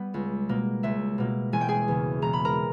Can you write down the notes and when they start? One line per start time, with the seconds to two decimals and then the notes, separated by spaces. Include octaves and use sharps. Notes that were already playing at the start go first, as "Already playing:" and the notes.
Already playing: G3 B3
0.14 C#2
0.49 B2 A#3
0.83 C#2 E5
1.18 B2 A#3
1.53 E1 G#5
1.61 G5
1.69 G#4 G#5
1.88 E2 C#3
2.22 E1 A#5
2.33 B5
2.45 A#4 A#5